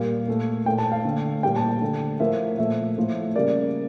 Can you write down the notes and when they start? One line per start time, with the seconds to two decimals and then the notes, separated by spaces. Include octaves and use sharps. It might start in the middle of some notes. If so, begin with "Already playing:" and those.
Already playing: A#2 G3 A#3 F5
0.28 A#2 A3
0.66 A#2 A3 G5
0.78 A5
0.92 F5
1.05 D3 A3
1.43 A#2 G3 A#3 G5
1.56 A5
1.82 D3 A3
2.20 A2 F3 A#3 E5
2.58 A#2 F3 A3 E5
2.97 A2 F3 A3
3.35 C#3 G3 A#3 D5